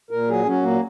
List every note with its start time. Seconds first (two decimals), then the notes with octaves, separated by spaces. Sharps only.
0.11 A#2 A#4
0.28 F#3 G#4
0.45 F#3 C#4
0.63 A#2 A#3